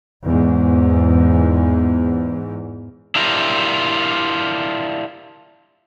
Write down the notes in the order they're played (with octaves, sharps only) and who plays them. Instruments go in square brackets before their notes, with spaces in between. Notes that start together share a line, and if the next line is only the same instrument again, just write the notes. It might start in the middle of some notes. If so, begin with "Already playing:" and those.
[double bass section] E2 G#2
[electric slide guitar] D4 E4 F4 G4 A#4